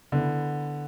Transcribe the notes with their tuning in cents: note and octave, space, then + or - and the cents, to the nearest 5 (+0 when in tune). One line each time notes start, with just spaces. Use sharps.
D3 +0 B3 -10 E4 +0